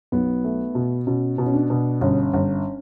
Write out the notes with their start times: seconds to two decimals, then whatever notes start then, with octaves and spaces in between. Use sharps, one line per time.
0.12 B1 B3
0.44 A3
0.75 B2
1.07 B2 C#4
1.38 B2
1.46 C#4
1.54 D4
1.70 B2
2.01 G1 C#4
2.33 G1